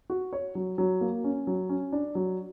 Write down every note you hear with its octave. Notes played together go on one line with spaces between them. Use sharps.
F#4
C#5
F#3
F#3
A#3
C#4
F#3
C#4
D4
F#3